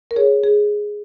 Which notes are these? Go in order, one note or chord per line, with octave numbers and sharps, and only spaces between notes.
A#4
G#4 C#5
G#4